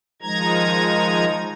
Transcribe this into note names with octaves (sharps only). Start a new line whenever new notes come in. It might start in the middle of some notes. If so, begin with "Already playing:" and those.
D#3 F3 G#3 D#4 A#5 G#6